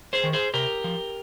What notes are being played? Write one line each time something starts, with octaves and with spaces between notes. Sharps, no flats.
G#4 C5
D#3
G#4 C5
C3 G4 A#4
F3